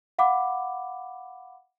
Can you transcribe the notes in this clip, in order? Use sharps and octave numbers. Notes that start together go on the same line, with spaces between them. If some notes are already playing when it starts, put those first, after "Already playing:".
F5 F#5 B5 D6